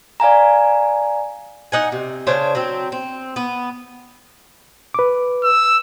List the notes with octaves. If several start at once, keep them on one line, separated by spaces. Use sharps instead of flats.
D5 F5 G#5 A#5
D#4 F#5 G#5
C3
C#3 D4 C5 C#5
F#3 C4
C4
B3
B4 D6
E6